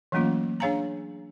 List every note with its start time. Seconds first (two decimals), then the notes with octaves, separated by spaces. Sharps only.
0.12 E3 F#3 A3 A#3 C#4 F4
0.60 D4 G#4 C#5 F5 G#5 A#5